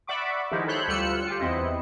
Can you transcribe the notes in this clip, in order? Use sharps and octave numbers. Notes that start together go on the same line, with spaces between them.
D5 E5 F#5 B5 C#6 D6
D#3 F3 G#3 D#4 E4 G4
A4 C5 C#5 B5 F#6 G6
D2 G3 F4 E6 F#6 C#7
F4 G4
E2 C4 E4 D#5